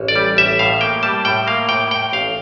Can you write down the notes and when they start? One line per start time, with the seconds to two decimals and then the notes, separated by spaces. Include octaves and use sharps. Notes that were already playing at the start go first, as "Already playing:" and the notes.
Already playing: A1
0.08 D5
0.16 G3
0.37 A1 E5
0.59 A2 F5
0.81 A#3 G5
1.03 G3 A5
1.25 A2 G5
1.47 A#3 F5
1.69 A2 G5
1.91 A2 G5
2.13 A1 F5